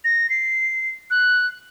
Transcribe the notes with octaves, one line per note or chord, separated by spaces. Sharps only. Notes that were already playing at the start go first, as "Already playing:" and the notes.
A#6
C7
F#6